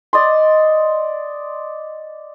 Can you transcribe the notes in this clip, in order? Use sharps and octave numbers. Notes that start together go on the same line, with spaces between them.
D5 D#5 C6